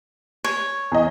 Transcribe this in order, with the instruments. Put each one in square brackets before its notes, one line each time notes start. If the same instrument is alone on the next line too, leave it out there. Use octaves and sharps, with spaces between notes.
[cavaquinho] C#5
[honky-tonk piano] E2 D#5